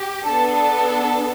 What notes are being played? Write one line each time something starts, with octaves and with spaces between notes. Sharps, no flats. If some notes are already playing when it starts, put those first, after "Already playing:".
Already playing: G4
B3 D4 A4 A5
A5